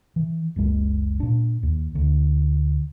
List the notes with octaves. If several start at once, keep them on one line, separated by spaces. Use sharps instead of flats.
E3
F#1 C#2 G#3
A#2 D4
D#2
D2